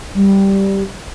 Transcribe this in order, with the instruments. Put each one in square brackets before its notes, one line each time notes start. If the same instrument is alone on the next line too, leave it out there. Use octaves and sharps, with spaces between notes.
[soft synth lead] G3